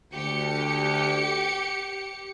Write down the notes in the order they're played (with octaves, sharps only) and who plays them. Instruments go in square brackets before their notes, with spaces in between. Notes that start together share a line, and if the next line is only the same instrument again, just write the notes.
[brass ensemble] D2 [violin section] G4 C#7